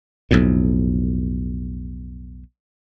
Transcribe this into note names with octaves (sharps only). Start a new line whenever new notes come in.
B1 F2 A2